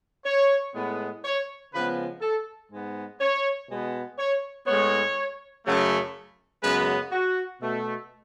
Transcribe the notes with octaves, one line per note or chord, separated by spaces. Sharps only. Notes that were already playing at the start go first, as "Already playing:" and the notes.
C#5
A2 G#3 B3
C#5
C#3 F3 G#3 B3 B4
A4
G#2 G#3 B3
C#5
B2 G#3 B3
C#5
A2 G#3 B3 C#5
F#2 C#3 F#3 A3
F#2 C#3 G#3 B3 B4
F#4
B2 A3